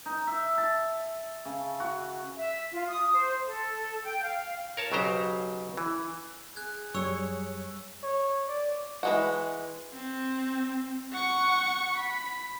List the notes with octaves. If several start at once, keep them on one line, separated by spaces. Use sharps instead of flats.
D#4
E5
A5
C#3
F#4
E5
F4
D#6
C5
A4
G5
F5
A#4 C#5 A5
B1 C#3 F#3 G4 C5 A#5
E3
G#4 F#6 G#6
F#2 G3 C#5 C#6 E6 C#7
C#5
D5
E3 G#3 F#4
C4
F#5 C#6
B5